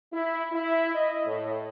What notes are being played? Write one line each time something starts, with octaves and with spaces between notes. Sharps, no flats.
E4
E4
D#5
A2